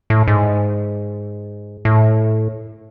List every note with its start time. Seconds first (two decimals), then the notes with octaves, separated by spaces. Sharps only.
0.10 A2
0.28 G#2
1.85 A2